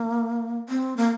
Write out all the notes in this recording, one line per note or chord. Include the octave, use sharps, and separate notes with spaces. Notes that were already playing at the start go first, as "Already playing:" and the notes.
Already playing: A#3
C4
A#3